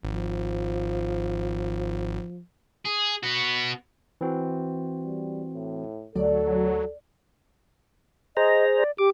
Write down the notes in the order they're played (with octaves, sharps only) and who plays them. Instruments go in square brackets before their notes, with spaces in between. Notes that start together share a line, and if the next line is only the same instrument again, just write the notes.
[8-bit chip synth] G#1 [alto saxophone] F3
[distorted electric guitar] G#4
B3 F#4
[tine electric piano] E3 C4 F#4
[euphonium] G3
A2
[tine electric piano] D2 [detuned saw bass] F#3 [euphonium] A4 [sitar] D5
[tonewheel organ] G#4 C5 A#5 [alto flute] D#5
[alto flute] D5
[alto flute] G4 [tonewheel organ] D6